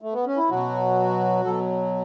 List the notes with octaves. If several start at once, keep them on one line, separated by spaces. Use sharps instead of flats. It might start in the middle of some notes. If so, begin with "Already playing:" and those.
A3
B3
C#4
E4
B2 F#3 F#4
B2 F#3 A4